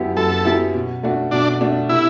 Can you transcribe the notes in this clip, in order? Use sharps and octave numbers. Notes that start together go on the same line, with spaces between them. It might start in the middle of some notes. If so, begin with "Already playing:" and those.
Already playing: F#2 F#3 B3 E4 G4
F#2 A4
F#3 B3 E4 G4
B2
A3 D4 F#4
B2 D4
A3 D4 F#4
C3 E4